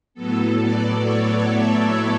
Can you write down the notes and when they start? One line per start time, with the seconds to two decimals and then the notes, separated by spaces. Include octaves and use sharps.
0.14 A2 F#3 B3 A4
0.59 D5
1.02 C#5
1.46 E5